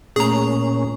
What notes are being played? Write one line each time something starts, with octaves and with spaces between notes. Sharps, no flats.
A#2 A3 C#4 G#4 A#5